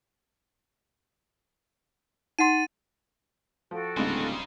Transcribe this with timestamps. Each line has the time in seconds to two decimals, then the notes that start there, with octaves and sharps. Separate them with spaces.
2.39 D#4 F#5 C6 A6 D#7
3.71 F3 F#4 A4 G5
3.97 D1 C#3 G3 G#3 D#4 C5